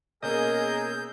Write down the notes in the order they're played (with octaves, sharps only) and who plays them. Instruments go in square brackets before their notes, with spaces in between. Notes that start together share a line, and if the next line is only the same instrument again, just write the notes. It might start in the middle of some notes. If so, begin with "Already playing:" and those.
[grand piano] B2 A#3 C#4 [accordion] G#4 A#4 E6 [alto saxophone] D#5 [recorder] G6